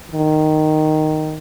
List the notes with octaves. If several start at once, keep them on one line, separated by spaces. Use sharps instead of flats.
D#3